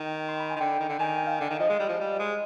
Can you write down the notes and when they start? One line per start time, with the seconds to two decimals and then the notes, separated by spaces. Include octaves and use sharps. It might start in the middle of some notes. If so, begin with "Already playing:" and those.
Already playing: D#3 G5
0.28 C6
0.39 B5
0.50 G#5
0.56 D#3
0.60 D3 G5
0.80 D#3
0.89 D3 G5
0.99 D#3 G#5
1.17 G5
1.27 F5
1.41 D3 F5
1.50 D#3
1.59 F3 D#5
1.70 G#3
1.79 G3
1.89 F3
2.00 G3
2.20 G#3